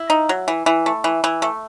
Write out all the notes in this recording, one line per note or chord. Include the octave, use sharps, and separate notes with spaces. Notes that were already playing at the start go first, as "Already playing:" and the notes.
Already playing: E4
D#4
F#3
E3
E3
A3
E3
E3
A3